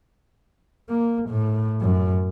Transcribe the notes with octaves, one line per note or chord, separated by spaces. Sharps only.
A#3
A2
F#2